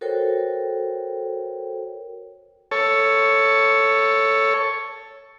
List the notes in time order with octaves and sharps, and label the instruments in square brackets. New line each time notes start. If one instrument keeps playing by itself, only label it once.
[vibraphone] F#4 A4 A#4 C5 C#5 G5
[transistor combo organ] A4 C#5